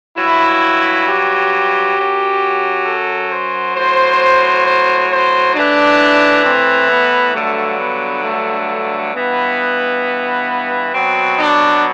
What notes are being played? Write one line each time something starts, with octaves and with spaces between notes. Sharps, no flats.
G2 F#3 E4
G4
F#2 F#3
A4
C5
A2 F#3 C5
C5
C5
A2 E3 D4
C4
B3
G2 D3 F#3 A3
B3
A3
G2 E3 B3
B2 F#3 C4
D4